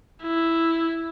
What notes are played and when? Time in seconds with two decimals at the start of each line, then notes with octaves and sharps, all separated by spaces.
0.23 E4